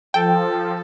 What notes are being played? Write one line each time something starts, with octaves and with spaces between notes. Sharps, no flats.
F3 A4 G5